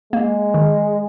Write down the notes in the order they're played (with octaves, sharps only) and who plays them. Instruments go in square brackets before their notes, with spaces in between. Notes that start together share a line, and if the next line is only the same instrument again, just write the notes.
[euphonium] G#3 [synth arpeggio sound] A#3
[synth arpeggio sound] D#3